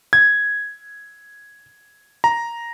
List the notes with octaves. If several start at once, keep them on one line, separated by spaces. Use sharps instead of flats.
G#6
A#5